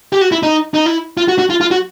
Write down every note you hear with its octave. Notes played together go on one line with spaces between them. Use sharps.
G4
F#4
E4
D#4
D#4
E4
F4
F#4
F#4
F4
F4
F#4